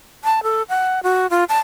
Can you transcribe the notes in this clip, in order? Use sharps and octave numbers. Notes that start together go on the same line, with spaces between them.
A5
A4
F#5
F#4
F4
A5